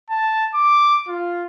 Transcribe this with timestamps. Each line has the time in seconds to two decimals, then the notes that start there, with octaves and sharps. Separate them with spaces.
0.10 A5
0.55 D6
1.08 F4